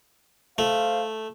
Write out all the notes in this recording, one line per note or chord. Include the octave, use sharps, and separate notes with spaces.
A3 C5 F5